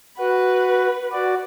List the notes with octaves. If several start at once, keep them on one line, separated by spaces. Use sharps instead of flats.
F#4 B4
F#4 D5